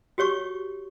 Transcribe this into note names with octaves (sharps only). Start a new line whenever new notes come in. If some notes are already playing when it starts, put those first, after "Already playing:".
F#4 G4 C#5 C#6